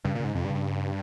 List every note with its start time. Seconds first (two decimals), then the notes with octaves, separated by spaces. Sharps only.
0.04 G2 C#3
0.15 A#2
0.20 G#2 C#3
0.35 F2 C3
0.45 G2
0.49 C#3
0.55 G2